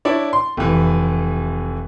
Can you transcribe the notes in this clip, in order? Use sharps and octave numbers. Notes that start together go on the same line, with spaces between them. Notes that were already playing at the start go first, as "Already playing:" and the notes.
D4 E4 C#5 D5
C6
F1 E3